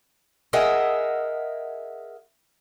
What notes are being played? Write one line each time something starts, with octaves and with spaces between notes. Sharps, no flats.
G#4 A#4 D#5 E5 F#5 G#5